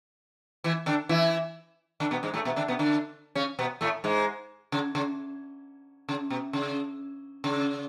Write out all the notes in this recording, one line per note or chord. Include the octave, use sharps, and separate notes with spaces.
E3 E4
D3 D4
E3 E4
D3 D4
B2 B3
G#2 G#3
A2 A3
B2 B3
D3 D4
B2 B3
D3 D4
C#3 C#4
B2 B3
A2 A3
G#2 G#3
C#3
C#3
C#3
B2
C#3
C#3